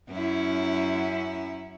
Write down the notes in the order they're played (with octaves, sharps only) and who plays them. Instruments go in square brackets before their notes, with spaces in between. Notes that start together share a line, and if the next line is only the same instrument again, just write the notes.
[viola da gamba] F#2 C#4 E4